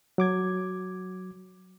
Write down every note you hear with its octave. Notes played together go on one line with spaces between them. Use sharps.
F#3 D6 G#6